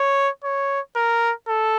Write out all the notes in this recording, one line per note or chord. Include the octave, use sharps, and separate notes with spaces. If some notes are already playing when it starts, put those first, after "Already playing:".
Already playing: C#5
C#5
A#4
A4